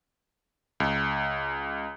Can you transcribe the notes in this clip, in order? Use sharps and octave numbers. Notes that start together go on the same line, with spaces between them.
C#2